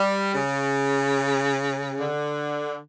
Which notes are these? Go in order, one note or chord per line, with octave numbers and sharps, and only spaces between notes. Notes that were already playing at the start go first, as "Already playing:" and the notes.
Already playing: G3
C#3
D3